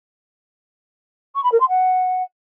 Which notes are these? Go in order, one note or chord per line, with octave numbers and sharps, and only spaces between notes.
C#6
B5
A#4
C6
F#5